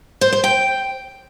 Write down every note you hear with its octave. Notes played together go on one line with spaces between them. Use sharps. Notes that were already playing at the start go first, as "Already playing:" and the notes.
C5
C5
G5